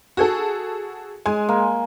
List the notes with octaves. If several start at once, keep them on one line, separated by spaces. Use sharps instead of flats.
F#4 G#4 A4
G#3 G#5
A#3